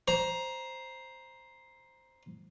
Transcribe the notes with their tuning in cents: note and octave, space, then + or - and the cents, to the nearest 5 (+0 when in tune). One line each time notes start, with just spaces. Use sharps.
C5 +0 A#5 +15